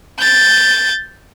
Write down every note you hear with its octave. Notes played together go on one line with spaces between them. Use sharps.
G6 A6